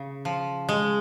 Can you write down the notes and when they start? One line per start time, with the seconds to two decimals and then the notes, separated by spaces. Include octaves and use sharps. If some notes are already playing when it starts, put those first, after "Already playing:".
Already playing: C#3
0.25 F3
0.69 G#3